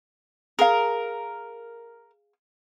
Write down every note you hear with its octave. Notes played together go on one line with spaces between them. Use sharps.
G#4 A#4 F5